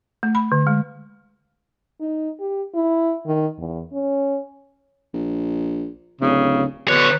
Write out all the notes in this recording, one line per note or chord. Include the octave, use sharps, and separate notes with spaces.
A3
B5
D3
G#3
D#4
G4
E4
D#3
E2
C#4
A#1
D1 C#3
B2 D3 B4 C#5